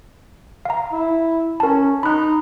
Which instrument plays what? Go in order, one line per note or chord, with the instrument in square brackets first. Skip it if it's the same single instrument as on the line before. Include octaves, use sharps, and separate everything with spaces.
[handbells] F5 A#5
[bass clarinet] E4
[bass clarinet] C#4 [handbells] A#4 A5
[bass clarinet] D#4 [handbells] B5 F#6